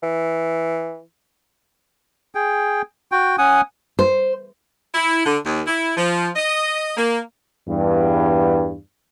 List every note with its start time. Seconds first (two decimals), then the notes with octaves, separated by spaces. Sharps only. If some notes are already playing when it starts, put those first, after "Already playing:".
0.03 E3
2.35 G#4 G5
3.12 F#4 G5
3.38 C#4 F#5 G#5 D#6
3.99 C5
4.94 E4
5.26 D3
5.45 D#2
5.67 E4
5.97 F3
6.36 D#5
6.97 A#3
7.68 E2 G2